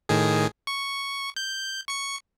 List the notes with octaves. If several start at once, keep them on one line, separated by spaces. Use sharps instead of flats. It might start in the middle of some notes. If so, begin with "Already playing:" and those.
A2 D#3 G#4
C#6
G6
C#6 C#7